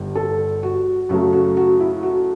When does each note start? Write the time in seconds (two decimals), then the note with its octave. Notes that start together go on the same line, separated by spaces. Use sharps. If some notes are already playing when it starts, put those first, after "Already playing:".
Already playing: G1 G2 D3
0.15 A4
0.63 F#4
1.09 F#2 C#3 F#3 A3 F#4
1.33 F#4
1.57 F#4
1.80 E4
2.03 F#4